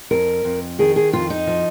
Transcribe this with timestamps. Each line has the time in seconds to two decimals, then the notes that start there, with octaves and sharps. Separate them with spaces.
0.11 F2 A#4
0.45 F2
0.79 D#3 G#4
0.96 G#4
1.13 F2 F4
1.30 D#4
1.47 F3